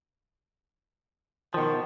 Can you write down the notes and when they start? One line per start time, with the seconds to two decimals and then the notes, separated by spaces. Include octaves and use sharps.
1.54 B2 D#3 F3